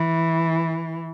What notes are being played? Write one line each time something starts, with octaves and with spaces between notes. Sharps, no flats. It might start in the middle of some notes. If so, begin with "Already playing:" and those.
Already playing: E3